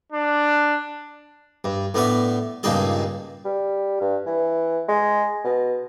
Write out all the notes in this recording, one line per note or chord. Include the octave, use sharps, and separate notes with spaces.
D4
G2
A2 B3 D4 E5
C#2 G2 A#2 D#4 G#4 A5
G3
G2
E3
G#3
B2